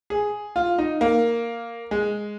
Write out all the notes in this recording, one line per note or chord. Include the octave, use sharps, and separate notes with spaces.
G#4
F4
D#4
A#3
G#3